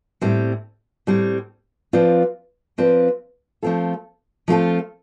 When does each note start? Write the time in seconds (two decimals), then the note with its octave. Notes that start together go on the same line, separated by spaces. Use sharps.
0.21 A2 G3 C4
1.07 A2 G3 C4
1.93 F3 C4 F4 B4 D5
2.78 F3 C4 F4 B4 D5
3.62 F3 A3 C4 F4 A4
4.48 F3 A3 C4 F4 A4